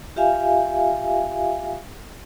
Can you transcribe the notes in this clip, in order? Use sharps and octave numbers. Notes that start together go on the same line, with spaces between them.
F4 G4 E5 F5 G#5